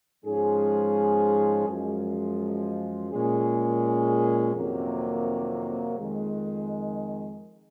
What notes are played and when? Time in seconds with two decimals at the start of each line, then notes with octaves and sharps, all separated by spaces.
0.23 G#2 F3 G#3 C#4 G#4
1.67 F#2 F3 G#3
3.10 A#2 G#3 C#4 G#4
4.54 F2 C3 D#3 F#3 A#3
5.98 F2 D#3 G#3